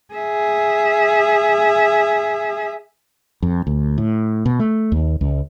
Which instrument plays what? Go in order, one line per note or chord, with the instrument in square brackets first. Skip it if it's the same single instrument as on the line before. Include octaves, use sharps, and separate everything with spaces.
[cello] G#4 E5
[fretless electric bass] F2
D2
A2
B2
A3
D#2
C#2